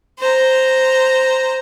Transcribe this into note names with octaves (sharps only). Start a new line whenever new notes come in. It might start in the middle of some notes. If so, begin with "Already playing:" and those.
C5 A#5